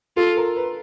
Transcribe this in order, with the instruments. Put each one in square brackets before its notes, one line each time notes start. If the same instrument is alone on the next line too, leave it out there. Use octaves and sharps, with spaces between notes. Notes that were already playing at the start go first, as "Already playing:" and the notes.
[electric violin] F4 [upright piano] A4
[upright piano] A#4
B4